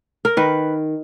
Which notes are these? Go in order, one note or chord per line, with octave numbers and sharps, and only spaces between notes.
A#4
D#3 B4